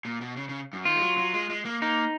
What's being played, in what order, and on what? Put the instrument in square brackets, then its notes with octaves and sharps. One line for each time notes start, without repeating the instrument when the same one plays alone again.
[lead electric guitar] A#2
B2
C#3
C#3
F#2
[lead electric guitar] D#3 [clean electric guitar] F4
[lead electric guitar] G#3
F#3
F#3
G#3
G#3
A#3
[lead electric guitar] A#3 [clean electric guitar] D#4